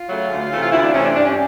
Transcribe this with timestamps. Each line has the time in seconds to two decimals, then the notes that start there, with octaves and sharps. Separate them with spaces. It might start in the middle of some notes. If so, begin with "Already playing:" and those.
Already playing: F4
0.09 C#3 F#3 A3
0.30 D2
0.52 C3 E3 A3
0.63 F4
0.72 D2 E4
0.84 D4
0.94 C3 E3 A3 C#4
1.05 D4
1.15 G2 D4
1.25 C#4